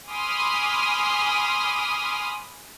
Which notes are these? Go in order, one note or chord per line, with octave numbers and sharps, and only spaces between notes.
G#5 B5 C6 D6 D#6 F6